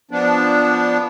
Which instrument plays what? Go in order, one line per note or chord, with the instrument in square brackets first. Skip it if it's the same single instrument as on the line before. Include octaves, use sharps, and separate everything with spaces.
[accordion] F3 B3 D4